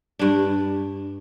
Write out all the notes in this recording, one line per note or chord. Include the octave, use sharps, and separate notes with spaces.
G2 D4